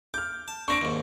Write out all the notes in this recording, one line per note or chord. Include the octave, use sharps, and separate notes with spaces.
D6 F6 G6
A5
C4 D4 C#6 A#6 D7
D#2 G#2